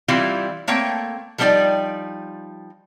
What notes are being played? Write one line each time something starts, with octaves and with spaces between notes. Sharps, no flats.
E3 G3 C4 E4 F4 F5
A3 A#3 C4 C#5 G5
F3 G3 D4 D#4 D5 G5